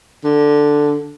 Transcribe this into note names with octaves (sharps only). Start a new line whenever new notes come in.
D3